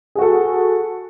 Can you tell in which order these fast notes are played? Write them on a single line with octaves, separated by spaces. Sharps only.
G#4 F#4 A4